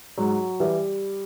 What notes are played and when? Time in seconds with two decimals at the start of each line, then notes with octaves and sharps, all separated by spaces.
0.18 G#2 F#3
0.60 E3 G3